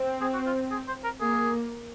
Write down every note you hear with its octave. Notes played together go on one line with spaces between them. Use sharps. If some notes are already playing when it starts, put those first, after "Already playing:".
Already playing: C4
G#4
F#4
F4
G#4
C5
A#4
A#3 G#4